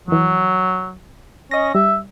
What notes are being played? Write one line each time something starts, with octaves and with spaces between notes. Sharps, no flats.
F2 E3 F#3
C#4 D#5 A#6
G3 E5